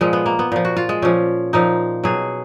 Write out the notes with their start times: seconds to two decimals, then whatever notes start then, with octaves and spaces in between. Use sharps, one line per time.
0.01 A#2 F3 G#3
0.13 B3
0.26 A#3
0.39 B3
0.52 A#2 F3
0.65 F#4
0.77 F4
0.89 G#3
1.02 A#2 F3 C#4
1.53 A#2 F3 D#4
2.04 B2 F#3 G#4